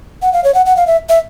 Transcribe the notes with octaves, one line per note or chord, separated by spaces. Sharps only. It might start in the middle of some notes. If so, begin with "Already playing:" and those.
F#5
F5
C#5
F#5
F#5
F5
E5
E5